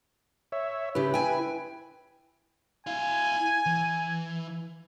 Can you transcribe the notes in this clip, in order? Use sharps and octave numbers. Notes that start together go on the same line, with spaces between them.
C#5 E5
C#3 E4 G4 B4
G5 G#5
E4 F5 G#5
E3